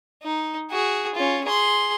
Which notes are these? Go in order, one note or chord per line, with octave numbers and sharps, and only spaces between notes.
D#4
F#4 G#4
C#4 F4
G#4 C6